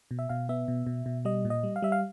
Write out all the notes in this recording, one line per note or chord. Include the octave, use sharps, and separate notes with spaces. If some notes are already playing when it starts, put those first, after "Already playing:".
B2
E5
B2 F5
B3 E5
B2
B2
B2
G3 D#5
A#2
D#5
G3
F5
G3 E5
F5